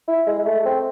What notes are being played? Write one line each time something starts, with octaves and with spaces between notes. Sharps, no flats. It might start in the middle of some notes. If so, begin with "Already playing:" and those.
E4
G#3
G#3
A3
C4